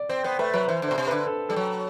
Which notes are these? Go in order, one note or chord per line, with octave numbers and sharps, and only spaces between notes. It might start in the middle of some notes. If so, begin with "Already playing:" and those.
Already playing: D5
C4 C5
B3 C5
A3 B4
F#3 B4
E3 C5
D3
B2 C5
C3
D3 B4
A4
G3 A4
F#3